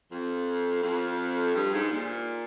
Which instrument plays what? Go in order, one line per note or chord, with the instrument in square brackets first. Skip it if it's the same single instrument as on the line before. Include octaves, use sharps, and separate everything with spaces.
[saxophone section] F2
F2
G2
G#2
A#2